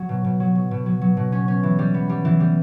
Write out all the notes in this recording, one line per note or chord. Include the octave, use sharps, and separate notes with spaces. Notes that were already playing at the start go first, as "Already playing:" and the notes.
Already playing: F#3
B2
B2
F#3
F#3
B2
F#3
F#3
B2
C#4
C#4
E3
G3
B3
G3
E3
G3